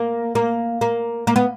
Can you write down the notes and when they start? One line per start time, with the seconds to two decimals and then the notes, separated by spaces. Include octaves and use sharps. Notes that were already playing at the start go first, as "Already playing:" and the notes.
Already playing: A#3
0.35 A#3
0.81 A#3
1.27 A#3
1.36 B3